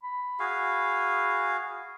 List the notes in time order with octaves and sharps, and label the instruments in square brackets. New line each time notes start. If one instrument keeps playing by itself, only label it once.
[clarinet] B5
[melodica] F#4 G#4 F5